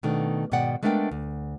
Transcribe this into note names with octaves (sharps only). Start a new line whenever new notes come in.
B2 D#3 A3 D4
G#2 B2 D#3 D5 F#5 G5
G#3 A3 B3 D4 A#4 G5
D2